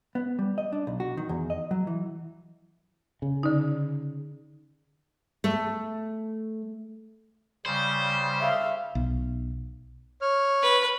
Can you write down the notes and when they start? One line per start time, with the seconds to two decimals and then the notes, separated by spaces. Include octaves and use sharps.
0.15 B3
0.39 G3
0.58 D#5
0.72 D4
0.87 B1
1.00 F#4
1.17 D#3
1.29 E2
1.50 D#5
1.71 F#3
1.87 E3
3.22 C#3
3.43 D3 D#4
5.44 A3
7.66 C#3 G3 C5
8.40 E5 F5
8.95 B1
10.21 C#5 F6
10.62 B4